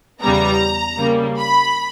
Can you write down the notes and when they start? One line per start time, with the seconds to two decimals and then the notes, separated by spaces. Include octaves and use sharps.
0.21 E2 C#3 G3 B3 A#5
0.99 C#3 G3 A#3
1.38 B5